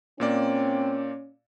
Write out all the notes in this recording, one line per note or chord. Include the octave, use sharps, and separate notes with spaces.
A#2 A#3 C4 C#4 D5